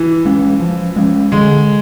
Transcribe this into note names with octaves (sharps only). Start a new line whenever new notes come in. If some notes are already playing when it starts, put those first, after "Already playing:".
Already playing: E3
G#3 C#4
F3
G#3 C#4
D3 G#3